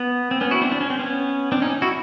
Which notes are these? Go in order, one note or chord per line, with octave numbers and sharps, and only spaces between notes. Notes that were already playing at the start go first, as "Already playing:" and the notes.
Already playing: B3
C4
B3 C#4
E4 F#4
C4 D4
D4
C#4
C4
B3 C#4
C4 D4
C#4 D#4
E4 F#4